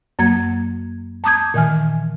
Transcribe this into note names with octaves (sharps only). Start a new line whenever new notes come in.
F#2 F#3 A#3 G#6
A5 A#5 D6 D#6 G6 G#6
A#2 D#3 E3 G#5 F6